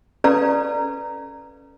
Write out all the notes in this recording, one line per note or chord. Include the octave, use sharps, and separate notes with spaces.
C#4 A4 B4 D5 F5 A#5